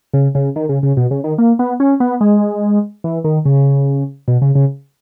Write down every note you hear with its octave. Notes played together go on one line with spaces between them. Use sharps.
C#3
C#3
D#3
C#3
C#3
B2
C#3
D#3
A#3
B3
C#4
B3
G#3
E3
D#3
C#3
B2
C#3
C#3